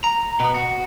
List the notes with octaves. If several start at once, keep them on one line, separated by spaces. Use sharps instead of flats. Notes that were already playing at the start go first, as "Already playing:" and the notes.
A#5
B2 B3
F#4